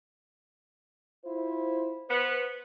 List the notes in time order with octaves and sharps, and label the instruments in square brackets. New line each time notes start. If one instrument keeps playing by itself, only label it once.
[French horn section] E4 F4 C5
[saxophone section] B3 [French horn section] C5